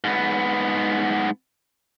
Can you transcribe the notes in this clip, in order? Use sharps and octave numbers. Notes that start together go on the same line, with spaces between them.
G#2 B3